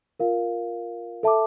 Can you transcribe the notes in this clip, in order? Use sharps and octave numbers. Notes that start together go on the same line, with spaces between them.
F4 A#4 F5
A4 E5 A5 D6